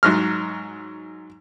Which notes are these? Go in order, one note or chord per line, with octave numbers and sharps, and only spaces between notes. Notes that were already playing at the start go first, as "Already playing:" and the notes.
G#2 F#3 F6